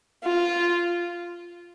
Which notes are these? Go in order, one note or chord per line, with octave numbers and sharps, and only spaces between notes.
F4